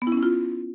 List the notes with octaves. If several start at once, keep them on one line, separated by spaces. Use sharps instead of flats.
B3
E4
C#4
E4
F4